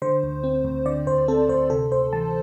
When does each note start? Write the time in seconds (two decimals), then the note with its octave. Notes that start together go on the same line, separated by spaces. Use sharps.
0.02 D3 C5
0.23 D2
0.44 C4
0.65 D2
0.86 D3 D5
1.07 D2 C5
1.28 C4 A4
1.49 D2 C5
1.70 C3 A4
1.92 D2 C5
2.13 E3 A5